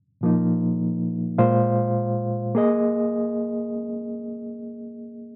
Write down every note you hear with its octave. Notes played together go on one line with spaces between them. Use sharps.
A#2 F3 A#3 D#4
A#2 G#3 F4 C5 F5
A#3 G#4 D#5